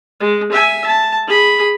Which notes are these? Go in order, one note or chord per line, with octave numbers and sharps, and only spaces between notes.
G#3
E5 G#5
A5
G#4 B5